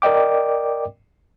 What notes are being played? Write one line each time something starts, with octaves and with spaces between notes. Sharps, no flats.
A#4 D5 D#5 G5 D6